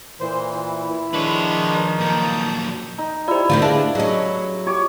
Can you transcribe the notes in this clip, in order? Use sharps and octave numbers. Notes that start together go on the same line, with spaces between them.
A#2 E3 C5
E4
D#3 F3 G#3 D4 B4 C#5
A#5
A#2 F#3 A5 D#6 G6
D#4
E4 F4 G4 C5 D5
D3 D#3 A3 C4 F4
D4 G#4 B4 E5
F#3 C#4 G#4 D#5
F4 G4 C#5 D6